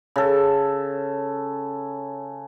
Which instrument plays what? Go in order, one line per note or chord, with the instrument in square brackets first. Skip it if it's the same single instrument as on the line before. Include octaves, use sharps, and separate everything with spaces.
[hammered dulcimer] C#3 A4